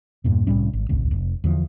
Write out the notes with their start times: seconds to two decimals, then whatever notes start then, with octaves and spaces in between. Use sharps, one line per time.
0.24 E2 G2 A#2
0.47 C2 A2 G3 C#4
0.73 G#1
0.89 D#1 G#1 C#2
1.11 F1
1.44 E2 D3 F3